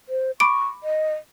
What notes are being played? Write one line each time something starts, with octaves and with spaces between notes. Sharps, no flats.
C5
B5 C#6 D6 D7
D#5